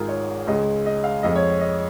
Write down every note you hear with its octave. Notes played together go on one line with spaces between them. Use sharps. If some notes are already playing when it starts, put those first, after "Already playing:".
Already playing: G#1 G#2 G#3 F4 G#4 A#4
C#5
C#2 C#3 G#3 D#5
D#5
F5
F2 F3 G#3 D#5
C#5
D#5